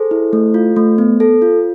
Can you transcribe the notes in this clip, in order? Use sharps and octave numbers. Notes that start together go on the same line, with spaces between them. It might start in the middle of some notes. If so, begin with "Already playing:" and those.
Already playing: G#4 A4 C5
E4
A3
F4
A3
B3
A4
F4